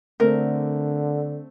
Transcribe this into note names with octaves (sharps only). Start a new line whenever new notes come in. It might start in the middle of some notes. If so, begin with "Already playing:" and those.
D3 A3 C4 A#4